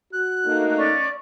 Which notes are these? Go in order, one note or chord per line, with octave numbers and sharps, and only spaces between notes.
F#4 F#6
A3 A#3 D#4
C#4 D5 C#6